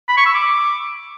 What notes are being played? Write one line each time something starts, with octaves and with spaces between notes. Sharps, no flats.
B5
C#6
E6
D6